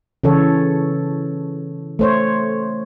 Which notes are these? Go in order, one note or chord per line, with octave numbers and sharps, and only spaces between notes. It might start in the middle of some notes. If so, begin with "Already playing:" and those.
C#3 E3 A4 C#5
A3 C5 C#5